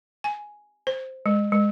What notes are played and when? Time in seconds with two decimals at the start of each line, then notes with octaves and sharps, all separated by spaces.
0.24 G#5
0.87 C5
1.26 G#3
1.52 G#3